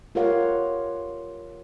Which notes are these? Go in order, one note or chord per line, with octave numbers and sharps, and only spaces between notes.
F4 G4 A#4 C#5 F5 F#5